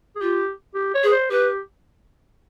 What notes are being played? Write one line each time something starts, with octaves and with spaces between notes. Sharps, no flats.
G#4
F4 G4
G4
C#5
G#4
B4
C5
G4 B4